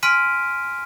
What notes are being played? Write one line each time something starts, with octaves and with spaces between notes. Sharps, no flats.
G#5 C6 F6 B6 D7 D#7